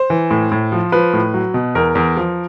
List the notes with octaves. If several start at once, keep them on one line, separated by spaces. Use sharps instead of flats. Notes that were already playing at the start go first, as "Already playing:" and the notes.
Already playing: C5
E3
A2
A2
F3
F3 B4
A2
F#3
B2
E2 A#4
E2
F3